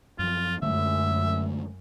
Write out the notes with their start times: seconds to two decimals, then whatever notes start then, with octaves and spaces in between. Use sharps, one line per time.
0.19 F#2 F3 F4
0.62 F#2 D3 G#3 A3 E5